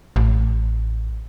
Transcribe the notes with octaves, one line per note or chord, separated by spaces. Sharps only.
A1